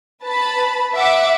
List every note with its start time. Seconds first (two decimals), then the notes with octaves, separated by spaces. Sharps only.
0.23 B4 A5 B5
0.95 E5 F#5 D6